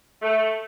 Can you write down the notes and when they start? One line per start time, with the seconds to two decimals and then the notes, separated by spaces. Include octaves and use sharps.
0.22 A3